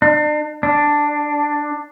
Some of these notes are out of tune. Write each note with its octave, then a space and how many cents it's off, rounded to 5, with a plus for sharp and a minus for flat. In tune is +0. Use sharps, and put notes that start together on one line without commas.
D4 +40
D4 +5